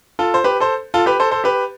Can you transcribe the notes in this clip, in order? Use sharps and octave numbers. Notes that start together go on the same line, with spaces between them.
F4 A4
C5
G4 B4
A4 C5
F4 A4
G4 B4
A4 C5
A4 C5
G4 B4